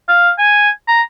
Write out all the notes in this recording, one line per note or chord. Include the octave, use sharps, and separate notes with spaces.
F5
G#5
A#5